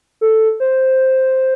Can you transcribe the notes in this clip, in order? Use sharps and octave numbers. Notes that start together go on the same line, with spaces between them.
A4
C5